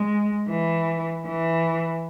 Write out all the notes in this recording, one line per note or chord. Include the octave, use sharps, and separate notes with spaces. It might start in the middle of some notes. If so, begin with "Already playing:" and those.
Already playing: G#3
E3
E3